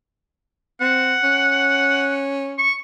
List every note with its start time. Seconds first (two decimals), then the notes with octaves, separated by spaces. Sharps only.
0.81 C4 F#5
1.24 C#4
2.58 C#6